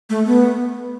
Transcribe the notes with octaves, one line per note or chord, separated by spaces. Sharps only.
A3
B3